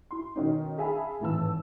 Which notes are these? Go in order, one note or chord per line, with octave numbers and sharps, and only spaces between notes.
E4 C6
B2 D#3 C#4 D#4
G#4 E5 F5 G#5 A5 B5
G#1 A2 E3 A5 E6